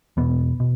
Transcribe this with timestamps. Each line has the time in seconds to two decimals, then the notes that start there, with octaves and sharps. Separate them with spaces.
0.17 E2 B2 B3
0.60 B2